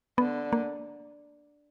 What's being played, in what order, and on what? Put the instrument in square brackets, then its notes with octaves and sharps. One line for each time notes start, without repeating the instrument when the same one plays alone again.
[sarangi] D3 [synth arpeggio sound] B3
[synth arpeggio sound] A#3